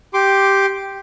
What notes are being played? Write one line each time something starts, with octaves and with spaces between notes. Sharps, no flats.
G4 C6 D6